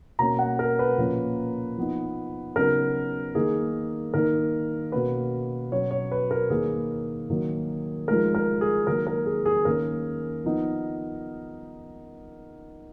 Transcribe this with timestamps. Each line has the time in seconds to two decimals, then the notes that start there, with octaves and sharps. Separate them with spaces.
0.19 B2 A#3 C#4 A#5
0.39 F#5
0.59 A#4
0.79 B4
0.98 A#2 F3 A#3 C#4
1.77 F3 B3 D#4
2.56 C#3 F#3 B3 D#4 A#4
3.35 D#3 A#3 D#4 G#4
4.14 D#3 A#3 D#4 A#4
4.92 B2 A#3 C#4 B4
5.71 B2 F#3 C#4 C#5
5.91 C#5
6.12 B4
6.31 A#4
6.50 D#3 A#3 D#4 G#4
7.30 D#3 F#3 A#3 D#4
8.08 F3 G#3 D#4 A#4
8.35 A#4
8.61 G#4
8.87 D#3 F#3 A#3 A#4
9.07 A#4
9.26 G#4
9.46 G#4
9.65 D#3 A#3 C#4 A#4
10.45 F3 B3 D#4